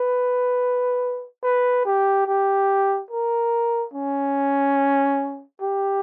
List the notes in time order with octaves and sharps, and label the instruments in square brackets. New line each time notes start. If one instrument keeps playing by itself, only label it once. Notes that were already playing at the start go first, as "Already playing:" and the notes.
Already playing: [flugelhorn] B4
B4
G4
G4
A#4
C#4
G4